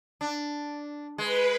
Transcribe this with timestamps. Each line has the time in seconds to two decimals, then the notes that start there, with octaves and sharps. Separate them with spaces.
0.21 D4
1.18 G#3 B4